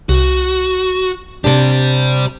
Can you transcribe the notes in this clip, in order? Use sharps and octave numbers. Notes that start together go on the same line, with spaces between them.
C2 F#4
C3 D4 G4 D5